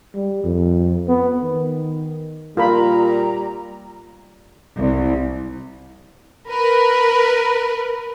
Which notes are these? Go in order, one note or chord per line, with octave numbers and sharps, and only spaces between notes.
G3
F2
B3
D#3
A#2 G3 F4 A#4 A#5 B5
C2
A#4 B4